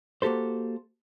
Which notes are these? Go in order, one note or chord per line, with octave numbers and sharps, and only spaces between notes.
A#3 F#4 G4 A4 C5